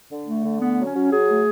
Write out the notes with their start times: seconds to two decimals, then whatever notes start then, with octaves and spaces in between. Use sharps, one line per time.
0.10 D3
0.27 A3
0.44 D3
0.60 A3 B3
0.78 F#3
0.86 C#4
0.94 F#3
1.11 F#3 G#4
1.28 A3